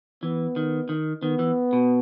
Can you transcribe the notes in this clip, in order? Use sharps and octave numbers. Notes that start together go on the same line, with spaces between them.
E3 B3
D#3
D#3
D#3 B3
E3
B2